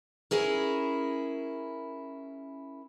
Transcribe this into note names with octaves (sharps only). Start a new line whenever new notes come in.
C#4 E4 G#4 A#4